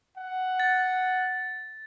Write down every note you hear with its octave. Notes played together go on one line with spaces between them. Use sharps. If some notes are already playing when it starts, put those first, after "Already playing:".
F#5
A6